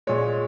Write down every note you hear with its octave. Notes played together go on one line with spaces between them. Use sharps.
A#2 G#3 C#5